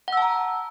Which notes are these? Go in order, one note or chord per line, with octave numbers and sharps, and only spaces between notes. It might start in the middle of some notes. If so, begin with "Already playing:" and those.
F#5 A5 A#5 E6